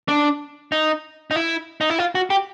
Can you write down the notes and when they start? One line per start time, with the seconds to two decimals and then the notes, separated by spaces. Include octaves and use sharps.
0.09 D4
0.72 D#4
1.31 D#4
1.36 E4
1.81 D#4
1.90 E4
1.99 F4
2.15 F#4
2.30 G4